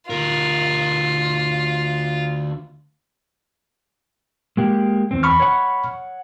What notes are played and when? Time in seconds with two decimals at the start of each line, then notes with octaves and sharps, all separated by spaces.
0.10 D2 F4 A#4
4.57 G#3 A#3 G4
5.11 E2 C4
5.23 B5 C#6 F6
5.40 C#5 F#5